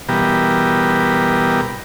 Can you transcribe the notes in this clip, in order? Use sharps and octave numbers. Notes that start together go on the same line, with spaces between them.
B2 E3 G3 B3 G4 A#4